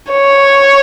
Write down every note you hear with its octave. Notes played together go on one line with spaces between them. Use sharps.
C#5